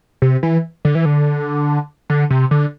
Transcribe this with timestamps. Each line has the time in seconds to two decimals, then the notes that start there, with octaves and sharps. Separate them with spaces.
0.22 C3
0.43 E3
0.85 D3
0.95 E3
1.05 D3
2.10 D3
2.30 C3
2.51 D3